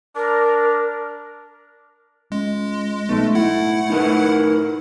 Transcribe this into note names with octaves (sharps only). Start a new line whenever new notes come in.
D4 A#4
C#2 G#3
B1 A3
A2 E4 F#5
D#4 A#4 B4